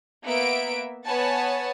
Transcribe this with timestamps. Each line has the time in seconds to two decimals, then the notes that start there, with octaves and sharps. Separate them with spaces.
0.23 A#3 B3 E5 D7
1.05 B3 B4 C#5 F#5 G#5 A5